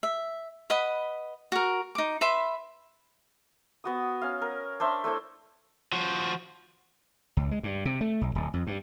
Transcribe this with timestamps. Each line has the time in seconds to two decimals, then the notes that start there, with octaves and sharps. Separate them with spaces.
0.03 E5
0.70 B4 D#5 F#5 B5
1.52 F#4 A#4
1.95 D#4 D6
2.21 B4 E5 B5 C6
3.84 B3 F#4 D#6
4.21 C#4 F5
4.42 A#4
4.80 D4 C5 E5 C#6
5.04 A3 D4 E4 C5
5.92 F3 F#4
7.37 C#2
7.51 G#3
7.63 G2
7.85 C3
8.01 A3
8.21 B1
8.35 D1
8.54 F2
8.67 G2